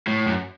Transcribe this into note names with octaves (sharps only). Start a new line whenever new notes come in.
A2
F#2